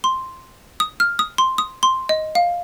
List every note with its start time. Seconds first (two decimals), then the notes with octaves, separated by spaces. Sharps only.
0.04 C6
0.80 D#6
1.00 F6
1.19 D#6
1.38 C6
1.58 D#6
1.83 C6
2.09 D#5
2.35 F5